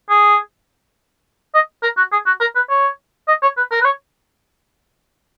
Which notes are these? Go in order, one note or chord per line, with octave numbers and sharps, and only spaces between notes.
G#4
D#5
A#4
F#4
G#4
F#4
A#4
B4
C#5
D#5
C#5
B4
A#4
B4
C#5